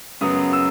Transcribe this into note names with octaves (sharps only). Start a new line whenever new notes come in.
F#2 C#3 F#3 B3 D#6
E6